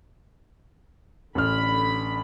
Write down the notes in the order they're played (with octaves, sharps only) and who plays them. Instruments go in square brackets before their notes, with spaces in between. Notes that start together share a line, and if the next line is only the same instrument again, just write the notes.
[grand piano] A1 F6 [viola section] D3 B5